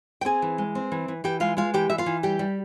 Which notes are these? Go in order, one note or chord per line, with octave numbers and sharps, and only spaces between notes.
G5
C4 G#4 G#5
E3
G#3
C4
E3
E3
E3 G4 G5
G#3 F4 F5
G#3 F4 F5
E3 G4 G5
E3 E5
F4 F5
E3
G3 G4 G5
G3